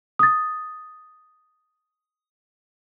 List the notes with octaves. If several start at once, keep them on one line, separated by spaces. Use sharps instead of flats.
D#6 A6